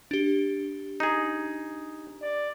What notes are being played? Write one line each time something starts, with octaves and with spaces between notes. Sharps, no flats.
D4 G4
D#4 G#4
D5